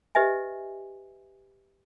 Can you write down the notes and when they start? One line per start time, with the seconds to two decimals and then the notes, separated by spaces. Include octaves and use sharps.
0.15 G4 B4 D#5 E5 G#5